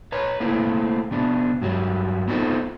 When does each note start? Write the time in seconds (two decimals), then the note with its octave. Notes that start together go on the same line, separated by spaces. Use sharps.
0.12 B4 C#5 A#5
0.40 A3 A#3 C4 E4
1.11 C3 B3 D4
1.62 G2 F#3 G3
2.28 B3 C4 D#4 F4 A4